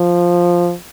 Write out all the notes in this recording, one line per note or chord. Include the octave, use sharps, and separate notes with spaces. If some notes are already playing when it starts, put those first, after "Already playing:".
Already playing: F3